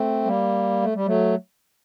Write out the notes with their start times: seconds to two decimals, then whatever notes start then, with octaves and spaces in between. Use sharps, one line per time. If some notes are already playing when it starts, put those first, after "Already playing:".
Already playing: A3 C4
0.25 G3 A#3
0.82 A3
0.95 G3
1.06 F#3 A3